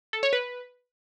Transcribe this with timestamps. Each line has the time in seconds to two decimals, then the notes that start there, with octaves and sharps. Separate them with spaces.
0.13 A4
0.23 C#5
0.33 B4